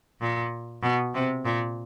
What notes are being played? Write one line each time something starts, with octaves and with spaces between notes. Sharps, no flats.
A#2
B2
C3
A#2